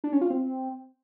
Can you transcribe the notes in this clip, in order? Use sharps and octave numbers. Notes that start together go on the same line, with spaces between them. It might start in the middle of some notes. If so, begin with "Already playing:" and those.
D4
C#4
F4
C4